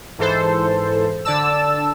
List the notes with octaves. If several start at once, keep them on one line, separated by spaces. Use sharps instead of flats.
G#2 E3 A4 C5
D3 D5 A5 E6